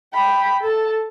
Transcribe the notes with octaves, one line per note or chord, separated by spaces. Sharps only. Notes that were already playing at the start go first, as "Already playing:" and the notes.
G5 B5
A4 A5